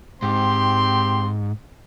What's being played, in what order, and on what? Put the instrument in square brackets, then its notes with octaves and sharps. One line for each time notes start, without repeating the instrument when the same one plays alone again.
[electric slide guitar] G#2 [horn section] C4 G4 C6